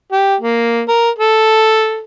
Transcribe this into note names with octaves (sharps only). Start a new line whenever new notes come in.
G4
A#3
A#4
A4